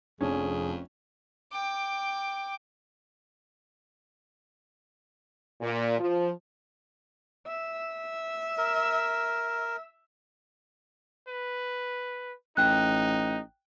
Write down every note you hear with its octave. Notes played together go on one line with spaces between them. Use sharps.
F1 F2 C#4 D4 G#4
G5 D6
A#2
F3
E5
A#4
B4
A1 D#4 G5 F#6